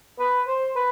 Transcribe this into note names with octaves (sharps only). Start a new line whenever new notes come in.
B4
C5
B4